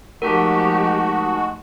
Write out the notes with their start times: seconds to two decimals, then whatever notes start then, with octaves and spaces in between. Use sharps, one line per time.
0.22 F3 G#3 A3 D#4 F#4 G4 A#4 A5